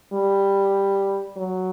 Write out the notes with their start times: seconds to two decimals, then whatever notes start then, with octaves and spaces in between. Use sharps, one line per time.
0.13 G3
1.37 F#3